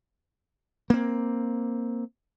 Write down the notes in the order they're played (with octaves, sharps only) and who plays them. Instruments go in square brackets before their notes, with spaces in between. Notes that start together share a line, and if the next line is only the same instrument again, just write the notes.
[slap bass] A#3 C4